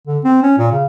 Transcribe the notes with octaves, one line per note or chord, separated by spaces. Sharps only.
D3
C4
C#4
A#2
C#3